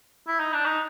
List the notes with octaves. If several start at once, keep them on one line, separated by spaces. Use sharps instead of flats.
E4
D#4
D4
D#4